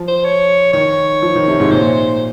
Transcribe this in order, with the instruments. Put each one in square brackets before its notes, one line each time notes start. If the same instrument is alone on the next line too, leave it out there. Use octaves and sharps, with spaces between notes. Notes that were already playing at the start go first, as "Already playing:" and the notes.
Already playing: [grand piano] F3
[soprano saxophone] C5
C#5
[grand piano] D#3 [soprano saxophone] C#5
[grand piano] F3
D#3
C3
G#2
[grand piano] A#2 [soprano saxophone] C5